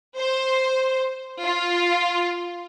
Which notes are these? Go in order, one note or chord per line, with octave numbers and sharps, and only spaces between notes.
C5
F4